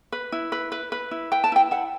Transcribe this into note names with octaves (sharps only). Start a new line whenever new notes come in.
B4
E4
B4
B4
B4
E4
B4 G5
A5
E4 G5
E4 F#5